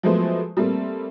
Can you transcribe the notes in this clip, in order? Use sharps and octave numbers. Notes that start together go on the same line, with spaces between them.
F3 F#3 G#3 A3 B3 C5
G3 A3 A#3 C4